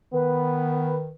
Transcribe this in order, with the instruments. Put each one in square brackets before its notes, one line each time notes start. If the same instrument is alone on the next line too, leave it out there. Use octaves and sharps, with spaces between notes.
[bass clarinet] D#3 [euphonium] B3 [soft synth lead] B4